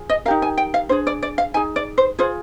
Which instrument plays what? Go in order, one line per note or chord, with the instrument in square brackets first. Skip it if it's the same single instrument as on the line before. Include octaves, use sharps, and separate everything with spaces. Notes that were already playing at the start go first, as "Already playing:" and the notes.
Already playing: [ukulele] F4 G#4
D#5
D#4 G4 A#4 F5
G#5
G5
F5
D4 G#4 C5
D5
D5
F5
D#4 G#4 G#5
D5
C5
F4 G#4 C5